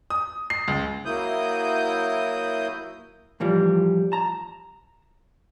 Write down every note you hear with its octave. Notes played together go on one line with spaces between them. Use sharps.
D#6
C7
C#2
F#3 A#3 E4 D#6 G6
A2 E3 F3 G3
A5 A#5